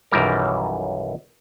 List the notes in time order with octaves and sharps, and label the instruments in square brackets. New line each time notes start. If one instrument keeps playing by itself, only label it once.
[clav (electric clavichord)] B1 F#2 D#3 E3 G3 A#4